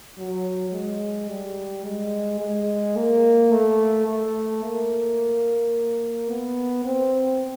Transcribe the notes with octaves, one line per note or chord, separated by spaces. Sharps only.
F#3
G#3
G3
G#3
G#3
A#3
A3
A3
A#3
B3
C4